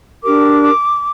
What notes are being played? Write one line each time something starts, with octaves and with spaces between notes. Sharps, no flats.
D4 G4 A#4 D6